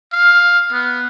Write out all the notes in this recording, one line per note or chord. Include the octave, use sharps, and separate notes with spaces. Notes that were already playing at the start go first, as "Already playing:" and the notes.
F5
B3